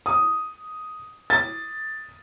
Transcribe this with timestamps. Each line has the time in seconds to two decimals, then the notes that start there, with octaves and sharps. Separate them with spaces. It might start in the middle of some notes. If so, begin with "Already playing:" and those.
0.06 D#6
1.30 A6